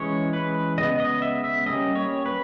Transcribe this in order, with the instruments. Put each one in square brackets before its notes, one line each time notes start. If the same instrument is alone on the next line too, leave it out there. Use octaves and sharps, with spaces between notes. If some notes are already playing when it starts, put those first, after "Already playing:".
Already playing: [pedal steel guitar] E3 G#3 C#4 C#5
B4
C#3 G#3 B3 D#5
D#5
E5
E5
G3 A#3 C#4 D#5
C#5
B4